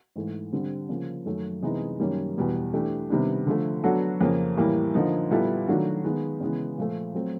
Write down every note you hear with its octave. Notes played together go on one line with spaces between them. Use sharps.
G#2 E3 A3
D3 G3 C4
C#3 F3 A#3
F#2 D#3 F#3 A3
C3 E3 G#3 B3 D#4
F#2 D#3 G3 A#3 C#4
E2 B2 G3 B3
E3 A3 D4 G4
C3 D#3 G3 B3 D4
D3 F3 A3
F#3 B3 D4 F#4 A4
F2 C#3 F3 A#3 C#4
A2 E3 G3 A#3
D3 F3 A#3 D#4
A#2 G3 B3 E4 A4
D#3 F#3 A3 D4 F#4
D#3 G#3 B3
C#3 E3 G#3 B3
A#2 F3 A3
F#3 A3 C4